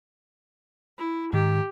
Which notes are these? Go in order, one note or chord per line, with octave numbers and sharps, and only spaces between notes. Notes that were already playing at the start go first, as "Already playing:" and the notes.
E4
G#2 D#3 G4